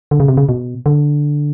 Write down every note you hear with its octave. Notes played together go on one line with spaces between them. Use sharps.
D3
C#3
C3
C#3
B2
D3